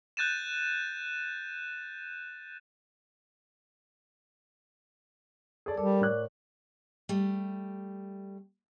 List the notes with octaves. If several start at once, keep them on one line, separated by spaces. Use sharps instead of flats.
F#6 G6 A6 D#7 E7
G#4 A4 D5
G3 A4 A#4 D5 D6
A2 F#6
G3 A3